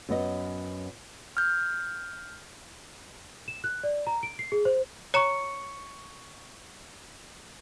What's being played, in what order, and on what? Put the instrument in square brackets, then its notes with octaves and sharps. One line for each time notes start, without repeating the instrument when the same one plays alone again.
[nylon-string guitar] F#2 B3 D#5
[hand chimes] F6 G6
[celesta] E7
F#6
D5
A#5
D7
C7
G#4
C5
[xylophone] C#5 A#5 E7 [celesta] C#6 C#7